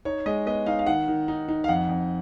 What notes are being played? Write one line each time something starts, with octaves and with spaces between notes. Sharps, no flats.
D#4 C#5
G#3 D#5
B3 D#5
D#4 F5
F5
D#3 F#5
D#3
D#4
D#4
F5
F2 F#5
F2